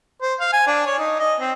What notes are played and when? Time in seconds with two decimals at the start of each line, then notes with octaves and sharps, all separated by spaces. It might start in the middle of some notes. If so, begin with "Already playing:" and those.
0.22 C5
0.40 F5
0.53 G#5
0.67 D4
0.86 C#5
0.99 D#4
1.19 D#5
1.40 C4